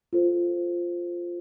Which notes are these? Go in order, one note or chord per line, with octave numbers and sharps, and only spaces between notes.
F4 A4 C5